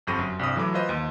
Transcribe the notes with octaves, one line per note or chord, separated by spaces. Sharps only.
G1 F2 G4 C#6 A#6 D#7
F#2
C2 G2 D#6
E3 F#3 A3 D6
F4 B4 C5 D#5
D#2